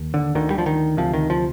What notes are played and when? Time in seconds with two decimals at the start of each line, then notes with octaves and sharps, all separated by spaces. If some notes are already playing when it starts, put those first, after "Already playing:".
Already playing: D#2
0.14 D3
0.35 D2 D3 D#3
0.50 G3
0.58 F3
0.66 D#3
0.97 D2 C3 F3
1.14 D#3
1.30 F3